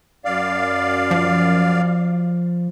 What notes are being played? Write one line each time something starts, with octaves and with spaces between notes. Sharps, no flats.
F#2 D5 F5
F3